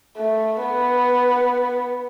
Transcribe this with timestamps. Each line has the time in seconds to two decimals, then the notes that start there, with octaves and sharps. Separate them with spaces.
0.17 A3
0.62 B3